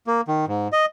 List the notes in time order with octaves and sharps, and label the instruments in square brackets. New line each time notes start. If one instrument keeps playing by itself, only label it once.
[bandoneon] A#3
D#3
G#2
D#5